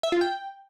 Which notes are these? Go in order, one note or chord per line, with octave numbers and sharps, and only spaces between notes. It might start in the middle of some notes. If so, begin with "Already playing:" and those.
E5
F4
G5